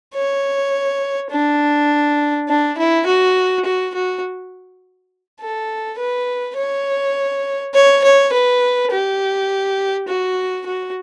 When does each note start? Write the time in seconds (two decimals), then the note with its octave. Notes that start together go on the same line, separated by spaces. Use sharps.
0.15 C#5
1.31 D4
2.49 D4
2.78 E4
3.06 F#4
3.65 F#4
3.94 F#4
5.41 A4
5.98 B4
6.57 C#5
7.74 C#5
8.04 C#5
8.33 B4
8.91 G4
10.08 F#4
10.66 F#4